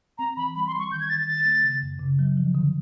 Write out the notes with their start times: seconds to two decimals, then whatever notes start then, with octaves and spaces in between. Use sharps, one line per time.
0.18 C4 A#5
0.37 E3 B5
0.55 G3 B5
0.67 C6
0.74 G3
0.79 C#6
0.91 D#3 G6
1.00 G#6
1.09 D#3 A6
1.27 D#3 A6
1.45 A#3
1.63 C#3
1.82 F#2
2.00 C#3
2.19 F#3
2.37 F3
2.55 D3